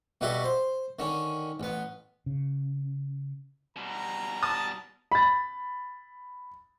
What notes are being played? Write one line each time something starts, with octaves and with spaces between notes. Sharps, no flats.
B2 G3 E4 F#4 G4 A4
C5
D3 D#3 C#4
A1 B3
C#3
B2 G3 A#5
A5 D#6
B5 A6